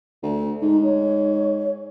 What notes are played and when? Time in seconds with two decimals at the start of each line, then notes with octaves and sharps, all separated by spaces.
0.23 D2
0.62 G#2 D#4
0.83 C#5